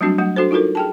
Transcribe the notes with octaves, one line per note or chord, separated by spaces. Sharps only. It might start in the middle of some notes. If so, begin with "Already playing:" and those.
F#3 G3 A3 C4 D4 F#4
F#3 A3 F#5
D4 F#4 A4 C5
D#4 F4 F#4 A4 A#4
G#4 G5 A5